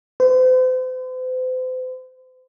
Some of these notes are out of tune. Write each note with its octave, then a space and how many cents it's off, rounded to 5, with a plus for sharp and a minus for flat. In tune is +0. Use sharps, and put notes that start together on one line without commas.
C5 -40